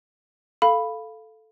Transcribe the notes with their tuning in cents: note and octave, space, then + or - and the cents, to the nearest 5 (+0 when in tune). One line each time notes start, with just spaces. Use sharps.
A4 +0 F5 -5 B5 +0